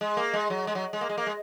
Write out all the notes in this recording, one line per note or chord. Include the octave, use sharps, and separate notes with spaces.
G#3
A#3
G#3
F#3
G#3
F#3
G#3
A#3
G#3
A#3
G#3